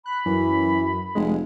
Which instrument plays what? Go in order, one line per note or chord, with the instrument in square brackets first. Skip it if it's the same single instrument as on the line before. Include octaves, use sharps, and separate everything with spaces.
[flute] B5 [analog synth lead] F#6
[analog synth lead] F#2 [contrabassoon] E3
[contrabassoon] F1 [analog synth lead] G#3